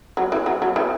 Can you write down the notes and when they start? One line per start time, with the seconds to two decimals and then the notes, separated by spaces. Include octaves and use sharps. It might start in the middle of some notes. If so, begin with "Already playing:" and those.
0.17 F#3
0.32 E3
0.46 F#3
0.62 F#3
0.76 E3